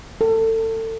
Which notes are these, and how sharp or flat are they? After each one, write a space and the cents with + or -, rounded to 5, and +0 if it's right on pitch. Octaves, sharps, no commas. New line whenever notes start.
A4 +30